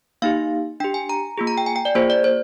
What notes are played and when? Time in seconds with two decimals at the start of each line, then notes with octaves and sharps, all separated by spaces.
0.22 A#3 D#4 G4 F5
0.80 D4 G5
0.84 G4
0.94 G#5
1.09 A#5
1.38 A#3 F4 G#4
1.47 A#5
1.58 G5
1.66 G#5
1.76 G5
1.85 D5
1.95 A#3 F4 G#4 C5
2.10 D5
2.24 C5